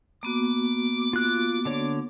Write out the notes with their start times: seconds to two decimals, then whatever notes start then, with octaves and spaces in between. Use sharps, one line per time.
0.23 A#3 B3 F#4 D6
1.13 F4 F#6
1.65 D3 D4 C#5